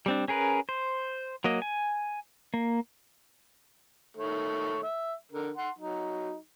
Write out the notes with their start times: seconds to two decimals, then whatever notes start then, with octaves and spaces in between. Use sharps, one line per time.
0.06 G3 C4 D4
0.28 C#4 G#4 A#4 B4
0.69 C5
1.44 F#3 A#3 D#5
1.62 G#5
2.54 A#3
4.17 D#3 A3 C#5
4.83 E5
5.32 D3 A#4
5.57 F#5 C6
5.79 F#3 D#4